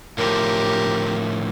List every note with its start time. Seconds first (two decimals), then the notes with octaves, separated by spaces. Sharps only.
0.18 A2 D3 F3 G4 A#4